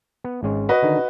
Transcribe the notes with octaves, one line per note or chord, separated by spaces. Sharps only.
B3
G#1 G#3 C#4
F#4 B4 D#5
D3 D#3 D#4